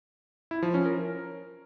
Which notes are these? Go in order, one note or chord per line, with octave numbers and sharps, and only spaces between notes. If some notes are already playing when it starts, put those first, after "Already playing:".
E4
F3
C#4
A#4